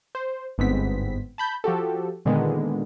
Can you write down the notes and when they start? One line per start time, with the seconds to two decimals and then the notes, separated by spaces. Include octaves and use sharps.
0.15 C5
0.58 G1 G#2 B3 C4 B6
1.38 A5 B5 G6
1.64 F3 F#4 G4 A4
2.25 A#2 D3 D#3 G#3 B3